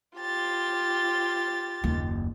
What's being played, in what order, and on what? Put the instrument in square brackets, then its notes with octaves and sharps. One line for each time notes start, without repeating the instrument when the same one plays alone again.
[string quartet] F4 G4 A6
[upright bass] F#1 D#2